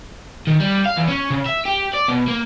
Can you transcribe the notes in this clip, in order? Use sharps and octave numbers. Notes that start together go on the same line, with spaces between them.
D#3
G3
F5
E2
C#4
C#3
E5
G4
D5
B2
A#3